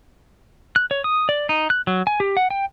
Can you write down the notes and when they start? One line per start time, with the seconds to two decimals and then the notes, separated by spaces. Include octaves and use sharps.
0.76 F#6
0.91 C#5
1.04 D#6
1.29 D5
1.49 D#4
1.70 F#6
1.87 F#3
2.07 G#5
2.20 G4
2.37 F#5
2.50 G5